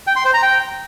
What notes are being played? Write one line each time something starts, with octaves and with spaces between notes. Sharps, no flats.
G5
C6
C5
A#5
G5